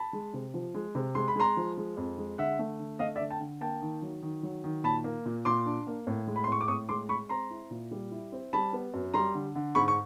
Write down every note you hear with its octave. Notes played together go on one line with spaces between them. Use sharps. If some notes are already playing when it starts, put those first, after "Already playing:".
Already playing: A5 B5
G#3
C3
F3
G#3
C3
G#3 C6
B5
G#3 A#5 C6
F3
G#3
F2
G#3
D3 E5 F#5
A3
D3
A3 D#5 F5
D5 E5
D3
G5 A5
D3
A#3 G5 A5
D#3
F#3
D#3
F#3
D#3
A#2 A5 B5
A#3
A#2
A#2 C6 D6
D4
A#3
A2
G#3
B5
C6
A2 C#6
D6
A2 C#6 D#6
G#3 C6 D6
G#3 B5 C#6
C4 A#5 C6
E4
A#2
G3
E4
C4
G3 A5 B5
B3
F#2
G3 A#5 C6
D3
D3
G#2 B5 C#6
C#6